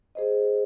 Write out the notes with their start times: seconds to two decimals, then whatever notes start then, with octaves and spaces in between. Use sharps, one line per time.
0.15 G#4 C5 D#5